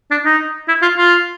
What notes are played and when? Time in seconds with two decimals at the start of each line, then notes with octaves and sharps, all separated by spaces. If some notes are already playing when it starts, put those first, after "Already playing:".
0.11 D4
0.25 D#4
0.68 E4
0.82 F4
0.97 F4